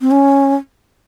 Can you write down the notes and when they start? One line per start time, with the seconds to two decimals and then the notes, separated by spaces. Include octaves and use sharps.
0.01 C4
0.11 C#4